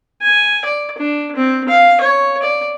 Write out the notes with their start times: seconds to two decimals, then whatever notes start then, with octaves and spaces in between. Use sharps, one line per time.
0.22 G#5
0.65 D5
0.98 D4
1.36 C4
1.68 F5
2.01 C#5
2.43 D5